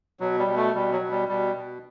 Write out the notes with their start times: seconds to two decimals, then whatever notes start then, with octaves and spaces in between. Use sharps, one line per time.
0.20 B2 F#3
0.39 G3
0.47 B2
0.56 A3
0.74 B2 G3
0.92 F#3
1.01 B2
1.11 G3
1.28 B2 G3
1.56 B2